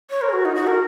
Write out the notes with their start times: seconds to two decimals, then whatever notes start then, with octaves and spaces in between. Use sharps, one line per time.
0.10 C#5
0.21 A#4
0.29 G#4
0.33 F#4
0.45 D#4
0.56 F#4
0.67 A#4